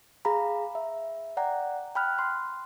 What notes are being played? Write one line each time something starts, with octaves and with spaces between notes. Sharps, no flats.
G#4 F5 A#5 B5
E5
D5 F#5 G5 A#5
G5 B5 F6 F#6
C6